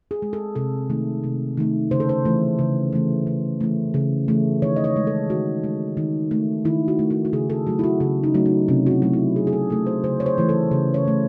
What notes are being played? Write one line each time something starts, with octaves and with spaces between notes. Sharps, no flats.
G#4
G#3
A4
C3 A4
D#3 A3
C3
D#3 A3
C#3 C5
A4
C5
E3 A3
C#3
E3 A3
C#3
E3 A3
C#3
E3 A3
D#3 C#5
D#5
C#5
G#3
A4
D#3 F#4
G#3
D#3
A3
D#3 E4
F#4
A3
F#4
F#4
C#3 G#4
A4
F#3 A3 F#4
E4
F#4
C#3 E4
D#4
F#3 A3
D#4
C3 C#4
F#4
E4
F#3 A3
E4
C3 G#4
G#4
A4
F#3 A3 A4
C5
C#3 C5
C#5
C5
E3 A3
A4
C#3
C#5
E3 A3